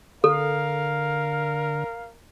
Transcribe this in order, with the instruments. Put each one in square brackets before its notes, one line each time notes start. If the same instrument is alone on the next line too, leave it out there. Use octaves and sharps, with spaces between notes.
[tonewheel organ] D3 [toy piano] A4 [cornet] A#4 [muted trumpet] F5